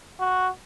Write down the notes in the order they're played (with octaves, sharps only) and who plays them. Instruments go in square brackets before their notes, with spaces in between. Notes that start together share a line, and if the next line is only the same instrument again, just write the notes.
[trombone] F#4